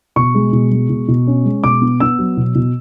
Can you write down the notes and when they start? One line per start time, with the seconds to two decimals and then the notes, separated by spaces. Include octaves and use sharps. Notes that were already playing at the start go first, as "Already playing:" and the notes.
0.16 B2 C#6
0.35 G#3
0.53 B2
0.71 G#3
0.90 B2
1.08 B2
1.27 C#4
1.45 G#3
1.63 B2 D6
1.82 B3
2.00 B3 E6
2.19 F#3
2.37 B2
2.55 B2